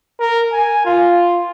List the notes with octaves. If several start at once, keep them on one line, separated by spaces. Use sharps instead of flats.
A#4
G#5
F4